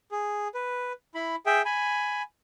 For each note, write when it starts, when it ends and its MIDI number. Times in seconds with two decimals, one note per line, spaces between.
0.11 0.48 68
0.55 0.92 71
1.15 1.36 64
1.15 1.36 83
1.46 1.62 68
1.46 1.62 76
1.46 1.62 79
1.65 2.22 80
1.65 2.22 83